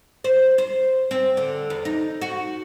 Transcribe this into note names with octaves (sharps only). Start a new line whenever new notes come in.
C5
C5
C4
D3
E2
D#4
F#4